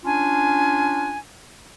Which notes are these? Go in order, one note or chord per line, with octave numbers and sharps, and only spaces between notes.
C#4 D4 F4 G#5